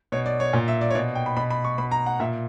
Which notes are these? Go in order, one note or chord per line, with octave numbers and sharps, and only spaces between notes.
B2 C#5
D5
C#5
A#2
E5
D5
C#5
B2 D5
G5
B5
B2 B5
B5
C#6
B2 B5
A#5
F#5
A#2 E5